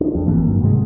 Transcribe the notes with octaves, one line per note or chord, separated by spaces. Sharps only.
D4
F2
G1 G2 E3 A#3
D#3 F#3
G#2 C3 G3 G#3